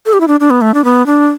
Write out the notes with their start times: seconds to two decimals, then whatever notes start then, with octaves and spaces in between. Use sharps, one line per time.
0.06 A4
0.13 G4
0.21 E4
0.28 D4
0.40 D4
0.50 B3
0.61 A3
0.74 D4
0.84 B3
1.06 D4